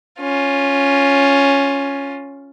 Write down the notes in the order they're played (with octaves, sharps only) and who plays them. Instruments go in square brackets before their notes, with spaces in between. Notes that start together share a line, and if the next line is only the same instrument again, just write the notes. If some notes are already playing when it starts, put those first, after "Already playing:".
[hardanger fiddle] C#4 F4